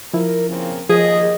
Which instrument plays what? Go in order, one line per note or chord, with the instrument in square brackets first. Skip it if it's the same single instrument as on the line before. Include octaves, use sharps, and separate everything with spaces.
[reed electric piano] F3 E4 [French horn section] A#4
[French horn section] C#3 A#3 C4
[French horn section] D#2 D#5 [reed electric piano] F3 [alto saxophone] G#4